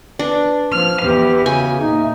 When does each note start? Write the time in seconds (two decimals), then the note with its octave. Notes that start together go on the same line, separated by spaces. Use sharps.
0.19 D4 B4
0.72 F3 F6
1.00 E2 G4 B4
1.46 C#3 F#4 G#5
1.80 A#2 D#4 E5